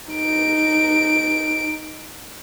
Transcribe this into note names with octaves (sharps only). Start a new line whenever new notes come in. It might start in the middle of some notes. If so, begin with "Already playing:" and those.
D#4 D7